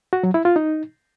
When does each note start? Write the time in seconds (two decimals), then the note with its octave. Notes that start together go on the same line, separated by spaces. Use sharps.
0.13 F#4
0.23 F#3
0.34 E4
0.45 F4
0.56 D#4